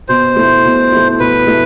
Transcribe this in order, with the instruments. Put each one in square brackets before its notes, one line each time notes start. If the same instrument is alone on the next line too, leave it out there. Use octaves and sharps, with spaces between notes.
[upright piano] B2 [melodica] C5
[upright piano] A3 E4
B2
A3 E4
[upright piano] B2 [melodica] B4
[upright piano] A3 E4